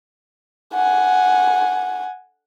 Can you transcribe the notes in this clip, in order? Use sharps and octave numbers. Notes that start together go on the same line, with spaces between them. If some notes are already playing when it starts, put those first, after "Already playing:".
F#5 G#5